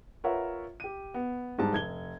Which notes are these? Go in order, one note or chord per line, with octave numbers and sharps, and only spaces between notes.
F4 A#4 B4 C#5 E5 F#5
G4 D#7
B3
G#2 G3 A5
F1 G#6 G7